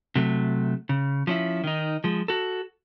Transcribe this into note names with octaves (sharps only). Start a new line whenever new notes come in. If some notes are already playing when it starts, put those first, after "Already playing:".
C3 F#3 A3
C#3
F3 C#4 E4
D#3 D#4
F3 G#3
F#4 A4